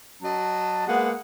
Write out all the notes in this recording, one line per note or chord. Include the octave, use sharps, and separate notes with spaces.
F#3 D#5 A5
G#3 A#3 B3 F#5